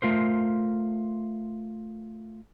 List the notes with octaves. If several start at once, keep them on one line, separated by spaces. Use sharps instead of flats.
A3 F4 A#4 C5